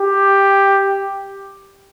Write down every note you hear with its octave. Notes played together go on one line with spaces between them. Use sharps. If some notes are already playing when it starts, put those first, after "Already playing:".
Already playing: G4